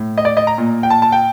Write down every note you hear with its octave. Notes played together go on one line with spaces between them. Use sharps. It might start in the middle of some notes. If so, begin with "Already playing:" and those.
Already playing: A2
D#5
D5
D#5
A#5
A#2
G5
A5
A5
G5